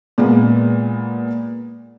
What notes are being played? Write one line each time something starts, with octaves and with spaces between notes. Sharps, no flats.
A#2 G#3 A#3 B3